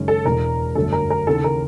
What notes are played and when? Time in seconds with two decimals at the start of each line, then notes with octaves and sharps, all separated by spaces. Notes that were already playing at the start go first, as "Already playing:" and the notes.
Already playing: F#1 F#2 D#3 G#3 C#4
0.08 A4
0.25 E1 E2 B2 A#4
0.75 G1 F#2 D3 F#3 A3 A4
0.93 A#4
1.10 A#4
1.27 D#2 C#3 E3 A4
1.44 A#4